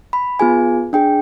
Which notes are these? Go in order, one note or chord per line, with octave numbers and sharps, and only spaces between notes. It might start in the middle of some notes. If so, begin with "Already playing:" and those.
B5
B3 F4 G#4 G#5
D4 G#4 G5